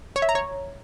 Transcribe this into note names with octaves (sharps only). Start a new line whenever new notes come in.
C#5
E5
A#5
C#5